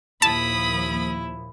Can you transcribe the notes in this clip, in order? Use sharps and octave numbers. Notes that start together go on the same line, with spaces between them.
D#2 A#2 F3 E4 A5 B5 D#6